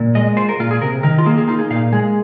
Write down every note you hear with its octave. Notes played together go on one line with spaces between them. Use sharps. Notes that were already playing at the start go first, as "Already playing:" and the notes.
Already playing: A#2
G#3 D#5
F4 C5
A#4
A#2 F4
G#4
C3 A#4
D#3 A#4
F4
A#3 G#4
G#4
D#4 F4
G#4
A#2 F5
G#3 G#4